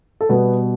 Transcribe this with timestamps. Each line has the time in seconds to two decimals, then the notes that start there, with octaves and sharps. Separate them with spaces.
0.21 A4
0.29 B2 G3 B3 B4